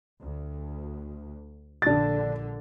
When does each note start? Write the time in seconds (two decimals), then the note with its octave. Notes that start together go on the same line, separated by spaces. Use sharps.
0.21 D2
1.82 A#1 D3 D4 A6